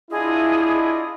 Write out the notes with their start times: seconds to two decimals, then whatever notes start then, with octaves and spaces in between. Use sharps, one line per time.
0.11 D4 E4 F4 G#4 D#5